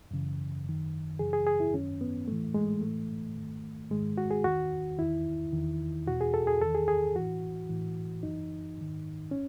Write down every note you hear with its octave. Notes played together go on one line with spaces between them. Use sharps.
F#2 C#3 E3
F#2 D#3
F#2 C#3 E3 G#4
G#4
G#4
E4
F#2 D#3 C#4
B3
A2 E3 A3
G#3
A2 E3 A3
G#2 D#3
G#2 D#3 G#3
F#4
G#4
E2 D#3 F#4
E2 D#3 E4
E2 D#3
E2 B2 F#4
G#4
A4
G#4
E2 D#3 A4
G#4
G#4
A2 E3 F#4
A2 E3
F#2 E3 D#4
G#2 D#3
C#4